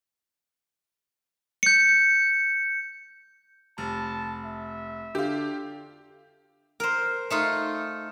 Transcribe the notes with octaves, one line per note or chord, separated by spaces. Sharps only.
G6 C#7
F1 A5
E5
D3 F4 G4
A#4 C5
A3 D#4 F4